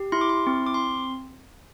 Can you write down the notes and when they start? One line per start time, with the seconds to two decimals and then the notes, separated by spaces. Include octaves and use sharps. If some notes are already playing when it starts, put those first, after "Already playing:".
Already playing: G4
0.12 E4 C6
0.21 D6
0.29 C6
0.47 C4
0.66 D6
0.74 C6